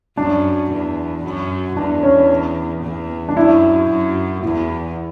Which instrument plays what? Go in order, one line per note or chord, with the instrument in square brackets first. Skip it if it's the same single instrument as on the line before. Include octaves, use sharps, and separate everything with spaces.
[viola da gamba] F#2 [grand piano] D4
[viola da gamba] E2
F#2
[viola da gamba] E2 [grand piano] D4
[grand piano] C#4
[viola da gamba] E2
[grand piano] D4
[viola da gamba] F#2 [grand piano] E4
[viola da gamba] F#2
[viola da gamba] E2 [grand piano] E4